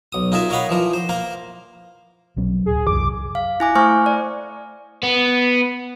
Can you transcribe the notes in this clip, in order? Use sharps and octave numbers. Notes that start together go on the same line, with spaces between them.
B1 D#6
D#4 F4 G#4 A#4 E5
A#4 C#5 D#5 F5 F#5 B5
E3 F3 A#4
C5
A#3 A#4 C5
B1 F#3 C#4
D1 G#4
C2 F#2 E3 D6
F5
E4 G#5 D6
A3 C5 G#5 C#6 F6
D5
B3